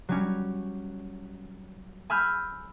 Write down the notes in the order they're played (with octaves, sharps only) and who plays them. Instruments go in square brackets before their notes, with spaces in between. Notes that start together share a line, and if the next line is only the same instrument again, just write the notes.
[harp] F#3 G3 C#4
G#5 B5 E6 F6 G6